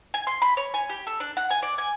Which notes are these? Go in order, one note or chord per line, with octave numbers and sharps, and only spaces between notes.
G#5
C6
B5
C#5
G#5
G4
A4
D4
F#5
G#5
D5
G#5